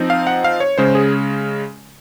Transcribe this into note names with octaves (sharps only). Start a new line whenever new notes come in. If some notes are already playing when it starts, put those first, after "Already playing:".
Already playing: F3 C4 D#4
F5
F#5
F5
C#5
C#3 G#3 C#4 C5
G#4